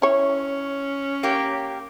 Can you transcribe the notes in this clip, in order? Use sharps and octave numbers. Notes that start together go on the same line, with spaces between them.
C#4 E4 C#5
A#3 G4